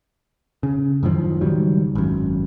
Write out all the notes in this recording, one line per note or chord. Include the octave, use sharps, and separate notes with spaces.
C#3
F#2 A2 D#3 F3
C#2 D#3 F#3 G3
G#1 F#2